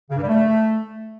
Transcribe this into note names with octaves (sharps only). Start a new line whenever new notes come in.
C#3
G2
G3
A3